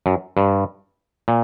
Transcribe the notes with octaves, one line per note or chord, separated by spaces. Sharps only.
F#2
G2
A#2